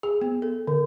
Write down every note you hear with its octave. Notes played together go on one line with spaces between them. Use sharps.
G#4
B3
A4
D3